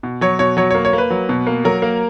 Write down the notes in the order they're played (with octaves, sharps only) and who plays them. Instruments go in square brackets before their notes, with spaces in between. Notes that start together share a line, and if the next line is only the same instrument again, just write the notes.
[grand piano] B2
F#3 C#5
B2 C#5
F#3 C#5
A#3 C#5
C#5
A#3 B4
F#3
B2
A#3
F#3 A#4
A#3